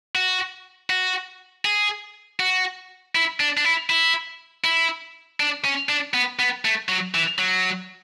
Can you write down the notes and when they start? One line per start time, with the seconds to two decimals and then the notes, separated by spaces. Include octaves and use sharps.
0.15 F#4
0.90 F#4
1.65 G#4
2.40 F#4
3.15 E4
3.40 D4
3.57 D4
3.65 E4
3.90 E4
4.64 E4
5.40 D4
5.64 C#4
5.89 D4
6.14 B3
6.39 B3
6.65 A3
6.89 F#3
7.14 E3
7.39 F#3